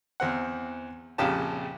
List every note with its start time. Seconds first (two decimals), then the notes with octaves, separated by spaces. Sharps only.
0.20 E2 C4 F#5
1.18 A#1 F2 C#3 G4 A5